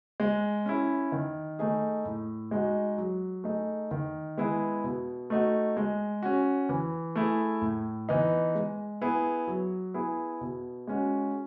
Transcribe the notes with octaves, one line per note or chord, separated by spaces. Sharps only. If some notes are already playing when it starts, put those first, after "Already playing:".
G#3
C#4 E4
D#3
A3 D#4 G#4
A2
G#3 D#4 F#4
F#3
A3 D#4 G#4
D#3
G#3 B3 E4 G#4
B2
A3 D#4 F#4
G#3
C#4 F#4
E3
A3 E4 G#4
A2
E3 B3 D#4
G#3
B3 E4 G#4
F#3
B3 E4 G#4
B2
G#3 C#4 F#4